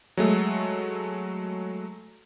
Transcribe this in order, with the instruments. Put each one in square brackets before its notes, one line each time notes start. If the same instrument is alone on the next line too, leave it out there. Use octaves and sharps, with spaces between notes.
[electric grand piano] F#3 G#3 A3